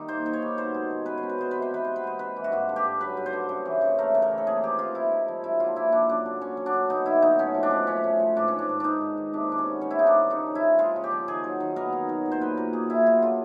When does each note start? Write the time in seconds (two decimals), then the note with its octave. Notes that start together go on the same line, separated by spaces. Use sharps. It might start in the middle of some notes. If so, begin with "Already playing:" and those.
Already playing: D#3 G3
0.08 A#3 C5
0.26 D#3
0.33 C#5
0.42 G3
0.57 B2 C5
0.74 G#3
0.90 B2
1.06 C#4 B4
1.18 C5
1.23 B2
1.29 B4
1.38 G#3 C5
1.51 C3 B4
1.62 C5
1.71 E3 B4
1.84 B3 C5
1.96 B4
2.04 G#3 C5
2.19 C3 B4
2.36 E3
2.44 F#4
2.52 G2 F4
2.69 D3
2.76 G4
2.84 G2
3.01 F#3 B4
3.17 G2
3.26 C5
3.33 D3
3.49 C#3
3.65 E3
3.81 C#3
3.99 A3 A#4
4.15 C#3
4.22 A#4
4.31 E3
4.38 A4
4.47 C3 G#4
4.63 F3 G4
4.79 C3 F4
4.95 G#3 E4
5.12 C3
5.28 F3
5.43 F#2 E4
5.60 D3 F4
5.76 A#3 E4
5.92 F3 D4
6.09 F#2 D4
6.25 D3
6.41 D3 C#4
6.57 F#3
6.66 D4
6.73 D3
6.90 B3 D#4
7.06 D3 E4
7.22 F#3 D#4
7.39 A2 C#4
7.55 F3
7.63 D4
7.71 C#4
7.87 A3 C#4
8.04 A2
8.20 F3
8.36 G#2 D4
8.48 D#3 C#4
8.59 D4
8.69 G#2
8.80 G#3 D4 D#4
9.01 G#2
9.18 D#3
9.33 C3 D4
9.50 D#3 D4
9.58 C#4
9.66 B3
9.81 G3 C#4
9.91 E4
9.98 C3 D#4
10.07 D4
10.14 D#3
10.30 C#3 D#4
10.46 F3
10.55 E4
10.63 C#3
10.79 G#3 F4
10.96 C#3
11.04 G4
11.11 F3
11.28 D#3 G#4
11.44 F#3
11.60 D#3
11.76 B3 A#4
11.93 D#3
12.09 F#3
12.26 A#2
12.32 C5
12.41 F#3 B4
12.57 A#2 A#4
12.73 A#3 G#4
12.90 A#2 E4
13.06 F#3 F4
13.22 D3 F4